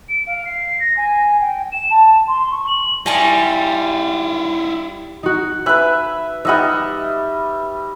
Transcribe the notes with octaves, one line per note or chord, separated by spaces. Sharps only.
D7
F5
C7
A#6
G#5
G5
E7
A5
C6
C#6
F#7
G3 E4 F4 D#5 G#5 C#6
D#4 F#4
B4 E5 G#5 B5 F#6
G3 D#4 D#5 E5 F#5